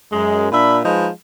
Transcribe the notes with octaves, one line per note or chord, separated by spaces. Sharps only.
F#2 G#3
A#2 D4 E5 B5
F3 G#3 D#4 B4